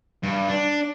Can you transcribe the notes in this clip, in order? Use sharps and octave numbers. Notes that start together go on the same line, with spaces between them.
G2
D4